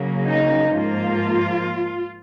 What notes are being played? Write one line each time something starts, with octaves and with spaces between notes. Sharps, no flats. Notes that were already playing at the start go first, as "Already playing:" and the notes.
Already playing: C#3 F#3 A#3 C#4
D#4
G#2 F3 A#3 F4